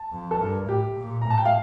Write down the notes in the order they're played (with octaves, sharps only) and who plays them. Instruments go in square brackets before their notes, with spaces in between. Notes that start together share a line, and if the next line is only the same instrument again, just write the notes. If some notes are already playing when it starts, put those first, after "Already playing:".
Already playing: [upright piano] A5
[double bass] F2
[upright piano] A4
[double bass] G2 [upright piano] A#4
[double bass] A2 [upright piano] G4
[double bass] A#2
[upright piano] A#5
[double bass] A2
[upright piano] A5
G5
F5